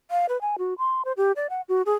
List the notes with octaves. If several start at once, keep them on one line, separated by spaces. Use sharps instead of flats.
F5
B4
G#5
F#4
C6
C5
G4
D5
F#5
F#4
G#4